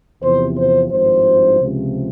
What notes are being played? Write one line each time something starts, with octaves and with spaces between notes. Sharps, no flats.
E2 C3 F3 C5
C5
G#1 G2 F3 C5
C#2 C3 F3